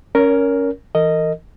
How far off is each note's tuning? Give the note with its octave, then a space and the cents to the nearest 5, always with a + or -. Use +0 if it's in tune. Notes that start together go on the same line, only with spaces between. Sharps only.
C#4 +0 A#4 +5 C#5 +30
E3 +0 A#4 -35 D#5 +0